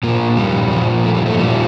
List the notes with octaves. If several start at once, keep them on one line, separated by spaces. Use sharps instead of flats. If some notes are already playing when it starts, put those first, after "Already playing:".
A#2 F3 A#3
G3
A#2 F3
A3
G3
A3
A#2 F3 G3